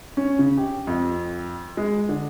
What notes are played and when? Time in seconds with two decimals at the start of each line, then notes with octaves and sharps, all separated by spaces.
0.17 C#4
0.39 C#3
0.57 G4
0.87 F2
1.77 G#3
2.09 D3